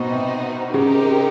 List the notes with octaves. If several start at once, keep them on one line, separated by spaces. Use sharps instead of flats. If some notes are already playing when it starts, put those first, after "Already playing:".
Already playing: B2 C4 D#4 F#4 B4 D#5
C3
C#3 C4 D#4 G4 A#4